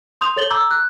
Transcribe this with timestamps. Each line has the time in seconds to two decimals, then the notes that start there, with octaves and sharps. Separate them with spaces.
0.21 C6 D#6 G6 F7
0.36 A4 C#5 A6 F#7 G7
0.50 A#5 D6 E6 G6
0.71 F#6